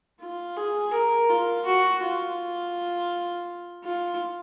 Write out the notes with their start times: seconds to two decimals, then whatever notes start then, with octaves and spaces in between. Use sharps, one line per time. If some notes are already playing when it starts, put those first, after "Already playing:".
0.21 F4
0.57 G#4
0.93 A#4
1.30 F4
1.66 F#4
2.02 F4
3.84 F4